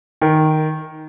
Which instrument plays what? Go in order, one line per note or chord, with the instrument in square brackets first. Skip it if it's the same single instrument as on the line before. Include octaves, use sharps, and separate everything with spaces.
[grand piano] D#3